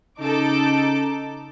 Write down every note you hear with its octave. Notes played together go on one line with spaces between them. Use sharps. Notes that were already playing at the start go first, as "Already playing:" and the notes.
C#3 D#4 A4 D6